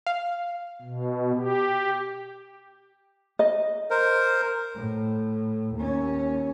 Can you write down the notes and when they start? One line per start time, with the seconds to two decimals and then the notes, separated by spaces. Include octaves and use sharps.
0.06 F5
0.82 B2
1.35 G4
3.39 D#5
3.90 A#4 C5
4.75 A2
5.75 D#2 C#4